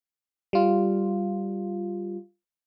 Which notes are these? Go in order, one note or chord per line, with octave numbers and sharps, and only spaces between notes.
G3 F4